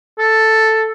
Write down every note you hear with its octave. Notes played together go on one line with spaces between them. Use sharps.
A4